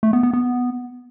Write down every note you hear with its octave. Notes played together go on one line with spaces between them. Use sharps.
A3
B3
B3
B3